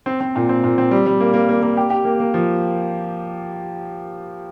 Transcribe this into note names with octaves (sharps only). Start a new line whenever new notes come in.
C4
C4
A#2
C4
A#2
C4
G3
G3
A#3
A#3
A#3
A#3
G4
G4
A#3
A#3
F3